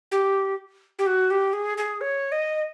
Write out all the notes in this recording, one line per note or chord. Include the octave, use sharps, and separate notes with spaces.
G4
G4
F#4
G4
G#4
G#4
C#5
D#5